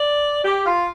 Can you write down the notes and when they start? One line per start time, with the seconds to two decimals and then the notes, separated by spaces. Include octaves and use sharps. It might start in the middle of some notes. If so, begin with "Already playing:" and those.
Already playing: D5
0.45 G4
0.66 F4